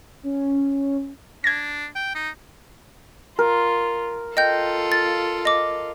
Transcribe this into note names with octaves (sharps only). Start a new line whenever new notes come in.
C#4
D4 G#6 A#6
G5
D#4
F4 A#4
F4 A4 D#5 F5 G5 G6
A6
D#5 D6